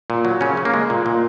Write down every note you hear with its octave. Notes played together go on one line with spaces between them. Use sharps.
A#2
F#3
C#3 C#4
C#3
A#3
G#3
A#2
A#2